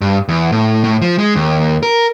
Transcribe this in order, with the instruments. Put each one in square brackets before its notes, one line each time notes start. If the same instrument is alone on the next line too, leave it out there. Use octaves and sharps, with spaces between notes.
[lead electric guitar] G2
E2
A2
A2
F3
G#3
D#2
A#4